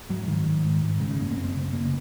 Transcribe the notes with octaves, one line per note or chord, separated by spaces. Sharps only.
G#2 F#3
G#2 D#3
G#2
G#2
G#2
C#3 G#3
F#2 A#3
A#3
F#2 C4
C#3
C#3 A#3